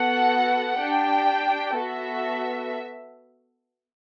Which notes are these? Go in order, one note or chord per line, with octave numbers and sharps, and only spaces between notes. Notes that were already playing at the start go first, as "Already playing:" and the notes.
Already playing: B3 F#4 A4 F#5
D4 G4 G5
B3 F#4 A4 E5